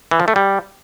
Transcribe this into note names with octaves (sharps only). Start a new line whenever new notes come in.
E3
F3
A3
G3